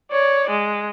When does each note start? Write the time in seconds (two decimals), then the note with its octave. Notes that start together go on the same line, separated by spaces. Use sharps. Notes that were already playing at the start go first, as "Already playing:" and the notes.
0.11 C#5 D5
0.50 G#3